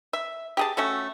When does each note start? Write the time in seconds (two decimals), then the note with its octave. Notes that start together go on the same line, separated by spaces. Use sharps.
0.13 E5
0.57 G4 G#4 A5
0.77 A3 C#4 F#4 A4